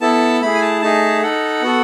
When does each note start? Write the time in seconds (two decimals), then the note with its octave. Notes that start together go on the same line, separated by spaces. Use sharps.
0.01 B3 E4 A4 A5
0.41 A3 E4 G#4 B5
0.55 G#5
0.61 A5
0.81 A3 D#4 G#4 A5
1.23 D#4 A4 F#5
1.62 B3 F#4 A4